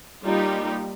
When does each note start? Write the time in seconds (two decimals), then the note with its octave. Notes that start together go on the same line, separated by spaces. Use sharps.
0.23 G3 A#3 D#4 F4 G4